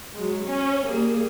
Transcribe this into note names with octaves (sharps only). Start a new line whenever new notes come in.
F#3 G#3
C#4
G3 A#3 G#4